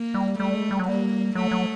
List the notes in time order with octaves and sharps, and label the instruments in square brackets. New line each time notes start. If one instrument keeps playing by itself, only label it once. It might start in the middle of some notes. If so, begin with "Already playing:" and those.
Already playing: [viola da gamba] A#3
[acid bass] G3
[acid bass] G3 [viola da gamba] A3
[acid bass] G#3
G3
F#3
[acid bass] G3 [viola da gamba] A#3
[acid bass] F#3 [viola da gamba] A3
[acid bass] F#3